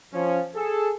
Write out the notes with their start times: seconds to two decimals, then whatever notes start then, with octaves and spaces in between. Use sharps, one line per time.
0.13 F3 C#4
0.55 G#4 A4